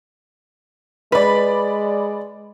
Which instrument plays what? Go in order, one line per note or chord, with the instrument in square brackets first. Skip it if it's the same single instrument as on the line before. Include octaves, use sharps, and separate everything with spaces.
[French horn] G#3 [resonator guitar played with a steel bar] B4 [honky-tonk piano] D5 B5